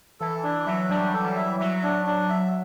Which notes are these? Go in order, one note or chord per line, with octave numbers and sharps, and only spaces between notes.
E3 A4
E3 D4
F#3 E5
G3 D4
A4
E3
E5
F#3 E5
D4
D4
E5